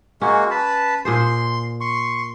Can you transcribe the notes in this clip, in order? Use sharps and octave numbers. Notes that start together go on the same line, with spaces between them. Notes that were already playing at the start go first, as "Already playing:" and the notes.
G#3 A#3 C#4 F#4
B4 A5 B5
A#2 G#4 C5 C6
C6 C#6